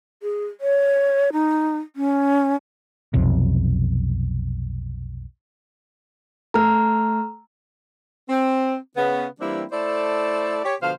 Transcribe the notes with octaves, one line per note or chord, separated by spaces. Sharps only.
G#4
C#5
D#4
C#4
B1 F2 C3
A3 A4 A#5 F6
C4
C#3 B3
E3 G3 A#3 C4 D4 E4
A3 E4 A4 C5 D5
G4 C#5
B2 D3 F3 C5 F5